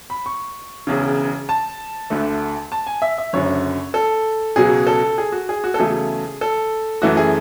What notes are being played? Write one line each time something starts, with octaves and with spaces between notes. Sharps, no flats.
B5
C#6
E1 E2 C#3
A5
D2 D3 A3
A5
G#5
E5
E5
F#1 F#2 D3 C#5
A4
C#2 B2 F#3 G#4
A4
G#4
F#4
G#4
F#4
A4
E2 C#3 F#3 A3 G#4
A4
F#2 E3 A3 F#4
G#4